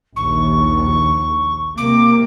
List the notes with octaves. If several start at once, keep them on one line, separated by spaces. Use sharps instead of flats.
A#1 D#2 C#6
C3 A#3 D6